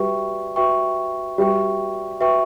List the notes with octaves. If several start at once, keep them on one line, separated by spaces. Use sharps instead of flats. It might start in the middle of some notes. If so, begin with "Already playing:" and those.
Already playing: G3 F#4 B4 E5 G5 C#6
F#4 B4 E5 G5 C#6
G3 F#4 B4 E5 G5 C#6
F#4 B4 E5 G5 C#6